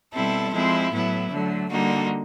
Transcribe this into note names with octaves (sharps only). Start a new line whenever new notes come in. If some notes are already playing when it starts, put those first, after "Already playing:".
B2 G3 C4 E4 A4
F3 G#3 C4 E4
A2 F#3 B3 E4
D3 F#3 A3
D3 G3 A#3 D#4 F#4